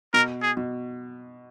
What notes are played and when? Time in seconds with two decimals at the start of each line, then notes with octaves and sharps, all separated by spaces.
0.14 B2 A#4
0.42 G#4
0.57 B2